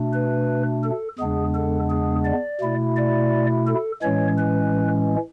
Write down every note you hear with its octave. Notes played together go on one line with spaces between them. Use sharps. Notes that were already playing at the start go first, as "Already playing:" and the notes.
Already playing: B2 A3 D4
B4
A4
E2 C#3 G#3 B3 D4 G#4
A4
G#4
D5
B2 A3 E4
D5
A4
A2 E3 G#3 C#4 C#5
B4